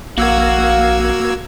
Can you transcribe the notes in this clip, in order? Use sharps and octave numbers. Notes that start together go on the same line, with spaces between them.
A#1 A#3 F#4 F5 F#5 E6 G#6